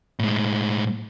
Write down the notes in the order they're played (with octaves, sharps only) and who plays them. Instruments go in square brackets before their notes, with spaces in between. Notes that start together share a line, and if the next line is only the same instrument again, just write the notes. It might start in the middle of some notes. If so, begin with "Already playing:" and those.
[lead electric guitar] A2 G#3